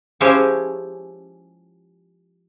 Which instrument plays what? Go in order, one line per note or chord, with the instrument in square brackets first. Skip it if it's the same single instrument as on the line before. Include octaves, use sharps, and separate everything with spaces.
[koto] F3 G#3 C#4 E4 G4 C5